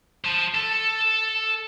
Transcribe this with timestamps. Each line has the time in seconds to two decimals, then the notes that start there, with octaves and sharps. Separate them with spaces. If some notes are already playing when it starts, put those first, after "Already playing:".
0.25 C5 A5
0.55 A4